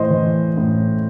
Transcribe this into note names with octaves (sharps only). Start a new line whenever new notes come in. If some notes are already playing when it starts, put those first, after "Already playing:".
Already playing: A2 E3 C5 D#5
E3
A2